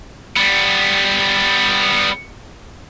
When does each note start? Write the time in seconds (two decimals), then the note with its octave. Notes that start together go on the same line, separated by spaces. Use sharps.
0.36 G3 B3